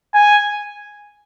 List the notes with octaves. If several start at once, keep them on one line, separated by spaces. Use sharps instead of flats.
G#5